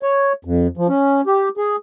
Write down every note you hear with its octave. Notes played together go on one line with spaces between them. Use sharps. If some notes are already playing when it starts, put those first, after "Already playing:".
C#5
F2
F3
C#4
G4
G#4